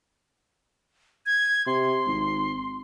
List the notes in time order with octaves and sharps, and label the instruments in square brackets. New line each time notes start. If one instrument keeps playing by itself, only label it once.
[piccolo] G#6
[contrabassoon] C3 [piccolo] C6
[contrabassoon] G#1